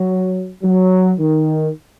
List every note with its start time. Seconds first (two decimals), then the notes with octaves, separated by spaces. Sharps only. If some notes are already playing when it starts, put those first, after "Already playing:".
Already playing: F#3
0.63 F#3
1.19 D#3